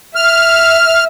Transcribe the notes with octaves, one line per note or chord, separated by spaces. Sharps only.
E5 F6